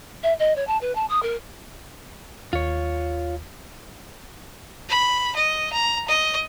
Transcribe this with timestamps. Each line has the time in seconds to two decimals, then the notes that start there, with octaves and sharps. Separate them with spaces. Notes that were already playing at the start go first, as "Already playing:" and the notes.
0.23 E5
0.39 D#5
0.56 C#5
0.67 A5
0.81 B4
0.95 A5
1.09 D#6
1.22 A#4
2.53 D#2 F4 C#5
4.89 B5
5.36 D#5
5.72 A#5
6.08 D#5